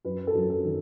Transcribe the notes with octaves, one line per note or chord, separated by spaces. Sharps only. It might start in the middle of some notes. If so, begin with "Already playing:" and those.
F#2 B4
A4
F#2
A4
D#3